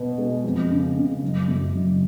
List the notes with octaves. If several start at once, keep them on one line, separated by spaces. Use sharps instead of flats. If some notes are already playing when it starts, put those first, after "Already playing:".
Already playing: B2 B3
G#3
F2
C#3
C#3
F#1
F#2
F#1